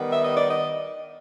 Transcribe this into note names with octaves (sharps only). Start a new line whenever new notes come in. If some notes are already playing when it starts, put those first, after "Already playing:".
Already playing: D#3 G3 B3
E5
D#5
D5
D#5